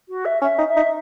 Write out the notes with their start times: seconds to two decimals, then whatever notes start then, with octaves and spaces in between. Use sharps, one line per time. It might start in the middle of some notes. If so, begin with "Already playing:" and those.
0.09 F#4
0.25 E5
0.41 C#4 E5
0.58 D#4
0.67 E5
0.76 D#4